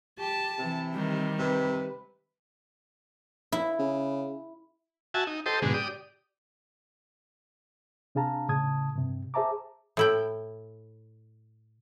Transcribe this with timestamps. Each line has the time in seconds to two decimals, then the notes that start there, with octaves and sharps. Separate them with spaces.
0.19 G4 A5
0.59 C3 E3
0.95 D#3 G3
1.39 C3 B4
3.52 E4
3.79 C#3
5.14 F#4 E5 G#5 A5
5.27 D#4
5.46 G4 A4 C5 D#5
5.62 G#2 B2 D3 G#3
5.74 G4 D5 D#6
8.15 C3 D4 G#4 F5 A5 A#5
8.49 A2 C#3 A5 D#6 G#6
8.96 G2 C3
9.34 G#4 C5 E5 A5 A#5 D6
9.97 A2 E4 G5